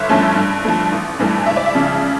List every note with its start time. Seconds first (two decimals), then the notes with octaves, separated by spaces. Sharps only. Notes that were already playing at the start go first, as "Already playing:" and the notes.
Already playing: G1 E5
0.09 G2 F3 A3 C#4
0.36 G2
0.64 F3 A3
0.92 A1
1.19 G2 E3 A3
1.46 C#2 E5
1.56 D5
1.66 E5
1.75 C#3 F3